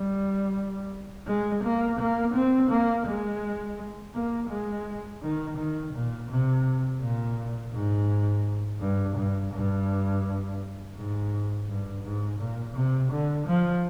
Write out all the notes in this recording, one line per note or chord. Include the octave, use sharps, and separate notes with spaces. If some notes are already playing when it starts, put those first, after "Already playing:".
Already playing: G3
G#3
A#3
A#3
C4
A#3
G#3
A#3
G#3
D#3
D#3
A#2
C3
A#2
G#2
G2
G2
G2
G#2
G2
G#2
A#2
C3
D3
F3